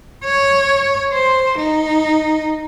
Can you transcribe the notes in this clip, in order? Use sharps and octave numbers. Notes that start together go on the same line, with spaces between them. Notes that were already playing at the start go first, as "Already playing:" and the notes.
C#5
C5
D#4